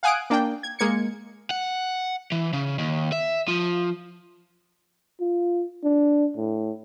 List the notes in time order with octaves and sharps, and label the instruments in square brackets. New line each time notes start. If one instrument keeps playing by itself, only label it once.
[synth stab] F5 F#5 G#5 D#6 F#6 D7
A#3 D4 G5
G#6
G#3 A#3 G#6 C#7
[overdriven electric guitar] F#5
E3
C#3
D#2
E5
F3
[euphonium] F4
D4
A2